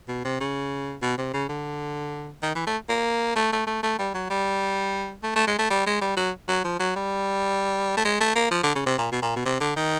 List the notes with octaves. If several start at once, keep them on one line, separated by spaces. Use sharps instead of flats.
B2
C3
C#3
B2
C3
C#3
D3
D#3
E3
A3
A#3
A3
A3
A3
A3
G3
F#3
G3
A3
A3
G#3
A3
G3
G#3
G3
F#3
F#3
F3
F#3
G3
A3
G#3
A3
A#3
F3
D3
C#3
C3
A#2
B2
A#2
B2
C3
D3
D#3